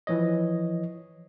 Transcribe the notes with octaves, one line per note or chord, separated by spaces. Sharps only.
E3 F3 C#5 D#5